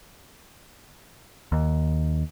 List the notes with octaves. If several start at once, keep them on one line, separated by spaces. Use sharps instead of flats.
D#2